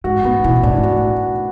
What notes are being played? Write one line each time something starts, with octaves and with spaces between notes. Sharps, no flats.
G#2 F#4
A2 B3
B2 E3
A2 D4
A2 F#4